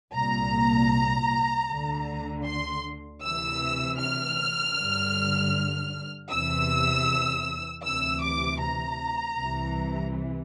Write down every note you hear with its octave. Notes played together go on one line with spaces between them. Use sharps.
C2 A#2 A#5
D2 D3
C6
D2 C3 E3 E6
F6
G2 D3
E2 C3 E3 E6
D2 C3 E3 E6
D6
A#5
C2 C3 E3